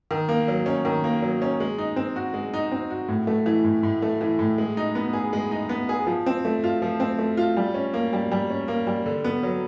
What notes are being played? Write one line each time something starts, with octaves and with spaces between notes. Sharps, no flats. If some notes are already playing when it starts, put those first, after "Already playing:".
D#3
A#3
F#3
C#4
D#3
A#3
F#3
C#4
G#3
D#4
C4
F#4
G#3
D#4
C4
F#4
A2
A3
E3
A2
A2
A3
E3
A2
G#3
D#4
B3
G#4
G#3
D#4
B3
G#4
F3
C4
A3
F4
F3
C4
A3
F4
G3
C#4
A#3
G3
G3
C#4
A#3
G3
D3
B3
F#3